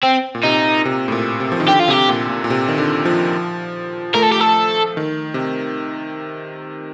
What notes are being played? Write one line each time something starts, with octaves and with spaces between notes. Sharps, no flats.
C4
A#2
C3 D#4
C3
A2
A#2
C3
F3
D#3
D3 G4
F4
C3 G4
A#2
A#2
A#2
C3
D#3
D3
F3
A3 A#4
A4
G4
A4
D#3
C3